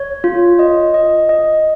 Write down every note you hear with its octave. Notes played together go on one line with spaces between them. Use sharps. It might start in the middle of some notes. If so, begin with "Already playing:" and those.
Already playing: C#5
F4
D#5
D#5
D#5